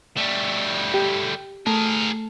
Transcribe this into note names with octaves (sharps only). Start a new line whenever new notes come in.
G3 A3
G4
A3 G#4 A#4